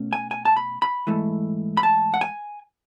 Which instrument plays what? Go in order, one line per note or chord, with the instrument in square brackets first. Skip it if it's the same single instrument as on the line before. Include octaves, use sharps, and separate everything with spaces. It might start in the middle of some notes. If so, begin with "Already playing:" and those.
Already playing: [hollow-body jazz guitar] B2 A3 C#4
G#5
G#5
A5
B5
B5
G#2 E3 A3
B5
A5
F#5
G#5